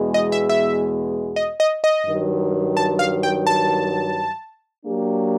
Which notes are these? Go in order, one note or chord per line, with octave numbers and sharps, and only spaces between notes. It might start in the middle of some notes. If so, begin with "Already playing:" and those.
Already playing: E2 B2 G#3
D#5
E5
E5
D#5
D#5
D#5
G2 D#3 F#3
A5
F5
G5
A5
F#3 A#3 D4 G4